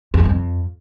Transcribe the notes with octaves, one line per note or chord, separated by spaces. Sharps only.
E2
G2
F2